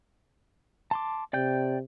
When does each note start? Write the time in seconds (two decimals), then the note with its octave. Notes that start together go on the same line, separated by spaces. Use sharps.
0.91 A5 C6 D6
1.33 C3 D5 G5 G6